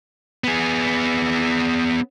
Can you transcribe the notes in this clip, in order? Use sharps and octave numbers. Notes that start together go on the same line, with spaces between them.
B3 G#4